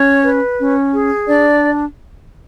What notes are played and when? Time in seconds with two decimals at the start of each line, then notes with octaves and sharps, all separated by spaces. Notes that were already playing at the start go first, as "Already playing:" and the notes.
Already playing: C#4 C#5
0.22 B4
0.58 C#4
0.93 G#4
1.28 D4 D5